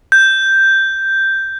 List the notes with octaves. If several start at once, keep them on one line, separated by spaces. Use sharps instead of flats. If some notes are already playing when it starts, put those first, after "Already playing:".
G6